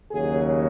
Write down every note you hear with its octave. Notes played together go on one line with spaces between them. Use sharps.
D#2 C#3 F#3 G#4